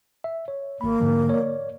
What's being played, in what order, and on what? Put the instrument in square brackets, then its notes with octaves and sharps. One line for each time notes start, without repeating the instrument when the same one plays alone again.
[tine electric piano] E5
C#5
[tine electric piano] G#1 B5 [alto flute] A#3
[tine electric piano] G#2 D3 F3
C#5 D5